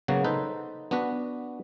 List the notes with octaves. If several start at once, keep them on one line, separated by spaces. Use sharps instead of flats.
C#3 F#3 A#3 B3 F#4
D#4 A4 B4 C5
B3 D4 F#4 B4